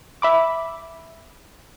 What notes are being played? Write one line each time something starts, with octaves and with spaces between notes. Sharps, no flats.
E5 B5 D6